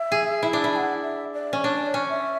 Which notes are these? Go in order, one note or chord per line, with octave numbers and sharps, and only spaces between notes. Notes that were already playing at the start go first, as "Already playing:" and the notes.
Already playing: E5
G#4
E4
D4
E4
A5
F#5
E5
D5
C#4
D4 C#5
D5
C#5
C#4
E5